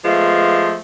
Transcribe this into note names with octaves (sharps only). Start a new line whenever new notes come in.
F3 G#3 A3 B3 F5